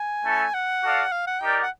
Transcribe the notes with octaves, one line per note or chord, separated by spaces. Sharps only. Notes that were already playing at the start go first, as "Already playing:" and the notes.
Already playing: G#5
A3 C#4 E4 A4
F#5
F#4 A4 D5 F5
F5
F#5
D#4 G4 A#4 D5 G5
F#5